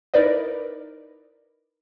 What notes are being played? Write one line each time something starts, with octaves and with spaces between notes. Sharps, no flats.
D#4 E4 A#4 B4 D5